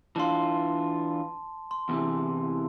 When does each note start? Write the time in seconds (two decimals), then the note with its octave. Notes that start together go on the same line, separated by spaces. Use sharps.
0.16 E3 D4 F4 A5 C6
1.71 C6
1.89 E2 C3 E3